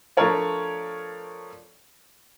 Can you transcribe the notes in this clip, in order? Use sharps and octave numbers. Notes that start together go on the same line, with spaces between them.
F3 A3 D4 A#4 C#5 D5